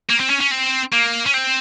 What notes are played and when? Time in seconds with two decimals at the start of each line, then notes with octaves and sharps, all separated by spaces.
0.09 A#3
0.20 C4
0.30 C#4
0.41 C#4
0.51 C4
0.93 A#3
1.26 C#4
1.34 C4